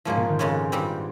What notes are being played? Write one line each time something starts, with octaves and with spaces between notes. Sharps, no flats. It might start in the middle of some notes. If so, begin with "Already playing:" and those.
G#2 F3 A#3 C#4 G#4
A#2
D#3
F2 C#3 G#3 C#4
G2 G3 C4